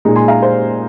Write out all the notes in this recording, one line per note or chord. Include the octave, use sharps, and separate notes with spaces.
A#2 G#3 D#4
G#5 C6
F5 A#5
C5